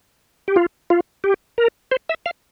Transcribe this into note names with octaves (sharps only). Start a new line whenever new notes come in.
G4
F4
F4
G4
A#4
C5
E5
F5